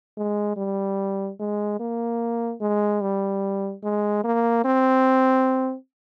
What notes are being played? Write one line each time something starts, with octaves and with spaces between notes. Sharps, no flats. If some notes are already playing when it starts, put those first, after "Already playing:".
G#3
G3
G#3
A#3
G#3
G3
G#3
A#3
C4